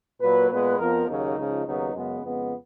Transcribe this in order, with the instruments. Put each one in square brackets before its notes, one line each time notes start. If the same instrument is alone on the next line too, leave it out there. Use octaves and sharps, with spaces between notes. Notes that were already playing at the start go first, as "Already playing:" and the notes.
[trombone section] A#2 F#3 A#3 B4
A#2 G#3 B3 B4
F2 F3 B3 A#4
D#2 C#3 F#3 A#3 D#4
C#2 C#3 F3
D#2 C#3 F#3 B3 D#4
F#2 C#3 G#3 B3
F2 C#3 G#3 B3